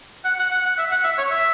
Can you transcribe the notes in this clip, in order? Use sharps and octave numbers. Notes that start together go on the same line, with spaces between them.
F#5
F#5
F#5
F#5
E5
F#5
E5
C#5
E5